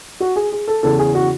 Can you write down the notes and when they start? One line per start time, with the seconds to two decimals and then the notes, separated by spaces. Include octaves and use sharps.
0.20 F#4
0.36 G#4
0.52 G#4
0.67 A4
0.83 E2 C#3 E3 A4
0.99 G#4
1.15 F#4